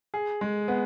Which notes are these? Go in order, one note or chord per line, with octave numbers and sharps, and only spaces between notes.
G#4
G#3
B3